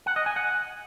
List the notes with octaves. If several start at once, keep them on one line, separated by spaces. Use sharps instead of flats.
F#5
D#5
G#5
F#5